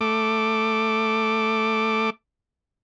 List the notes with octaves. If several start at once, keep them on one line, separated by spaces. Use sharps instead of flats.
A3 D6